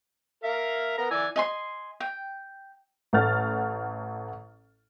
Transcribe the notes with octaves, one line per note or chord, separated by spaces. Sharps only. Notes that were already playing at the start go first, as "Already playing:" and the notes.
A#4 E5 F5
B3 A#4 A#5
E3 D5 G#5 E6
D#5 G#5 C6
G5
A1 A4 F#5 F6 A6